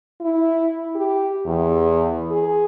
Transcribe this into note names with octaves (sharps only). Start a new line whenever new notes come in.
E4
G4
E2
G#4